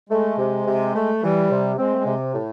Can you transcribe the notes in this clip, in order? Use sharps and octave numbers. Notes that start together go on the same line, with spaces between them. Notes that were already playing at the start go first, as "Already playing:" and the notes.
G#3 A3
C3
C3
A3
E3 G3
C3
G#3 C4
A3
G#3
C3
A2